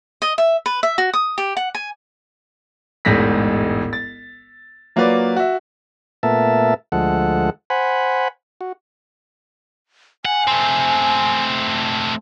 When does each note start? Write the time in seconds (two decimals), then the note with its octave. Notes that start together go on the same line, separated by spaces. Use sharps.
0.22 D#5
0.38 E5
0.66 B4
0.83 E5
0.98 F#4
1.13 D#6
1.38 G4
1.57 F#5
1.75 G#5
3.05 E1 A1 G#2 A#6 B6
3.93 A6
4.96 F#3 A#3 F4 F#4 B4 D5
5.36 F#4 E5
6.23 A#2 A3 B3 A#4 E5 A5
6.92 D2 F3 G#3 A4 F#5
7.70 C5 F#5 G#5 B5
8.61 F#4
10.25 F#5 G#5
10.47 A3 C4